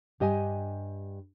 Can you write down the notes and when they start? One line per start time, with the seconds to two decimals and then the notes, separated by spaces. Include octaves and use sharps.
0.20 G2 G4 D#5 G5 G#5